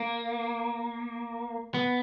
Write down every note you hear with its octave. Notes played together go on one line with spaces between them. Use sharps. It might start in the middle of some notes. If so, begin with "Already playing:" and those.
Already playing: A#3
B3